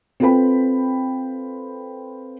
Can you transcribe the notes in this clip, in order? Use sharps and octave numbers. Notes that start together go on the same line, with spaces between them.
C4 F4 A4 B4 G5 B5